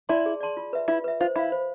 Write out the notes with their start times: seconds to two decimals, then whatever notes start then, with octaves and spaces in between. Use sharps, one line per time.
0.09 E4 D5 A5 C6
0.26 G#4
0.41 D5 A5 C6
0.57 F4
0.73 B4 E5
0.88 E4 F4
1.04 B4 E5
1.21 F4 C5
1.36 E4 F5 B5
1.52 C5